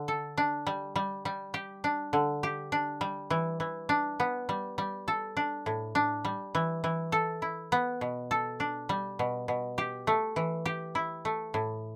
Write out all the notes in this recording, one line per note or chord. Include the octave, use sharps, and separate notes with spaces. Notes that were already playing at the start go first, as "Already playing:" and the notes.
Already playing: D3
A4
D4
G3
G3
G3
G4
D4
D3
G4
D4
G3
E3
E3
D4
B3
G3
G3
A4
D4
A2
D4
G3
E3
E3
A4
E4
B3
B2
A4
D4
G3
B2
B2
G4
A3
E3
G4
E4
A3
A2